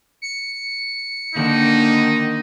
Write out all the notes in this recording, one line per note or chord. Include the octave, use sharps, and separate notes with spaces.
C#7
D3 D#3 A#3 D#4